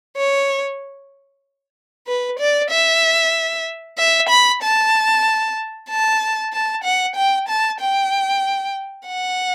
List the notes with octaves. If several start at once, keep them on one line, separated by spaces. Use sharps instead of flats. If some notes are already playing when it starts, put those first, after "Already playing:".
C#5
B4
D5
E5
E5
B5
A5
A5
A5
F#5
G5
A5
G5
F#5